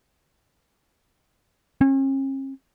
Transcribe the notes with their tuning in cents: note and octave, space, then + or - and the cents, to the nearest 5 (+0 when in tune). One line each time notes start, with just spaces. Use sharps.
C#4 -45